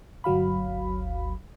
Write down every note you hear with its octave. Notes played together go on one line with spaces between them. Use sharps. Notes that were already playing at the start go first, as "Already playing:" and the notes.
G1 D2 F#3 F5 B5